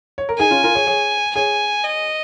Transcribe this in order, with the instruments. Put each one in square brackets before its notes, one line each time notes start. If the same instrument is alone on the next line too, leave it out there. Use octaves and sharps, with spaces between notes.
[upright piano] C#5
A#4
[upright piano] D#4 G#4 [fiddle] G#5
[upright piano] C#4 F4
F4 A#4
G#4 C#5
G#4 C#5
[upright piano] G#4 C#5 [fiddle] G#5
[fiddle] D#5